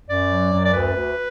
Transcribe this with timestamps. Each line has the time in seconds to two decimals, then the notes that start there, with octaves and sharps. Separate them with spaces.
0.08 F#2 D5
0.30 F#3
0.53 F#2
0.64 D5
0.73 D2 B4
0.95 D2